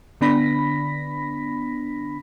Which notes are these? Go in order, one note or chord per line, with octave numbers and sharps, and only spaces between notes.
D3 B3 D4 B5 A#6 B6